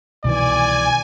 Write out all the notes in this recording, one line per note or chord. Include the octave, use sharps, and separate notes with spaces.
C2 B2 D#3 E3 D5 G#5